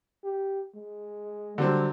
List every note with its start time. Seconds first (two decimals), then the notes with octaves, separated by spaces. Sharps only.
0.24 G4
0.76 G#3
1.58 D3 F#3 G3 C4